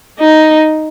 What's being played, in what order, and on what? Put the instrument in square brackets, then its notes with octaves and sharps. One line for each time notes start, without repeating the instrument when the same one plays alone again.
[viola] D#4